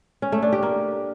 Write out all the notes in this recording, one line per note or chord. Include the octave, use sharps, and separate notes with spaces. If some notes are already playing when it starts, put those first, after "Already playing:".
C#4
A3
D4
G4
A#3